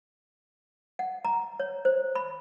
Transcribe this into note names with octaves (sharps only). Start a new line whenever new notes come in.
F#5
A#5
C#5
C5
B5